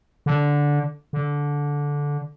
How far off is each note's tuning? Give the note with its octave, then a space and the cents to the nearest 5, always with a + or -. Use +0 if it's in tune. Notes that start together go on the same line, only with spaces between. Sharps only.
D3 -10
D3 -15